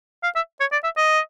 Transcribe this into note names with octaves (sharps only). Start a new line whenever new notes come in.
F5
E5
C#5
D5
E5
D#5